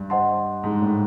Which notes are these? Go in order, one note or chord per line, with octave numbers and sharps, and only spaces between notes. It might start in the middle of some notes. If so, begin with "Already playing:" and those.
Already playing: G2
C5 D#5 F#5 A5 C6
G#2
A2